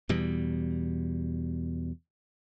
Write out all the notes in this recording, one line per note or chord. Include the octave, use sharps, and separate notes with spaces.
E2 B2 G3